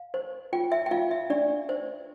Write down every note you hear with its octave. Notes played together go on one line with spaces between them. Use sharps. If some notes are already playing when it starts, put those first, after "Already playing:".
Already playing: F5
C5
F4 G5
E5
G5
F4 F5
E5
D4 D5
C5